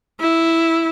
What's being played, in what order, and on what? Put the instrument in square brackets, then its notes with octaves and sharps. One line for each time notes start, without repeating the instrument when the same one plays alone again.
[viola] E4